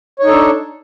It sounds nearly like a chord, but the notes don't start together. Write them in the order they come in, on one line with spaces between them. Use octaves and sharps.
C#5 D#4 A4 D4